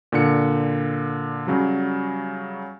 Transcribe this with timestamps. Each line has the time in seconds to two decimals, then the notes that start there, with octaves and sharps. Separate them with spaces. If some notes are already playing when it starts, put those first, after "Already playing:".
0.12 A#2 D3 C#7
1.47 C#3 F#3 G3